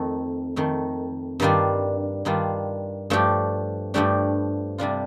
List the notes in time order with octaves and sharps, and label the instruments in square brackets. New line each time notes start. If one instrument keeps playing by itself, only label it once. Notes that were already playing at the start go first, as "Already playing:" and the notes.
Already playing: [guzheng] F2 D#3 A3
F2 D#3 A3
G2 D#3 G3 D4 F4
G2 D#3 G3 D4 F4
G2 F3 A3 D4 G4
G2 F3 A3 D4 G4
C3 G3 D4 F4